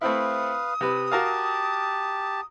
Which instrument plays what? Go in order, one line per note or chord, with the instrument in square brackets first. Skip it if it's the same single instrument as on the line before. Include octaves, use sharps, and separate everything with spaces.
[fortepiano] A3 C4 E4 [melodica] B4 F5 [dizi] D#6
[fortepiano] C3 B4
[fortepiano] F#4 A#4 F5 [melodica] G4 A5